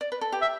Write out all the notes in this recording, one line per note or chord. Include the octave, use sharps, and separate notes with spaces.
D5
B4
A4
G4
E5